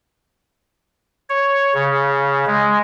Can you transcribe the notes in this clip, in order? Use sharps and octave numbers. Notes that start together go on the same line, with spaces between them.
C#5
C#3
G#3